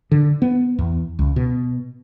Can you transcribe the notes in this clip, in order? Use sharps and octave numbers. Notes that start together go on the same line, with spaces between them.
D3
B3
E2
C#2
B2